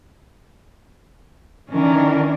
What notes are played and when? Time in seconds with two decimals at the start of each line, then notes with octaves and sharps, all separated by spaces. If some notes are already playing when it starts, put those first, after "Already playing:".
1.70 D#3 E3 C#4 D4 A#4